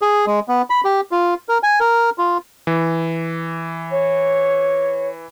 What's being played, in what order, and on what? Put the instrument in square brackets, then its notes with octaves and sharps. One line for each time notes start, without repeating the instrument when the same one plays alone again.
[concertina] G#4
G#3
B3
B5
G4
F4
A#4
G#5
A#4
F4
[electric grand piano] E3
[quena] C#5